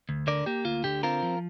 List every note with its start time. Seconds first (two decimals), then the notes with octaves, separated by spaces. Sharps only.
0.09 D2
0.27 D3 A#4 D5
0.46 A#3 G4
0.65 D2 F4
0.84 D3 G4
1.03 C4 F4 A#4
1.23 F3